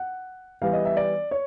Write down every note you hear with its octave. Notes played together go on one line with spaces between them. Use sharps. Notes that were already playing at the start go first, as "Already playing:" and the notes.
Already playing: F#5
E3 G3 B3 F5
D#5
E5
D5
C#5